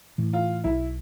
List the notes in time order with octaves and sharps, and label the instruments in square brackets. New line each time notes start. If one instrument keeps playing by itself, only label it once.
[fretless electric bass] A2 E3
[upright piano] F4
[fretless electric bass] B1 [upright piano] E4